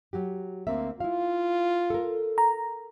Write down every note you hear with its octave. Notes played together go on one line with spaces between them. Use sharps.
F#3 F#4 G4
D2 A#3 C4 E5
E4 F4 F5
A4 A#4
A#5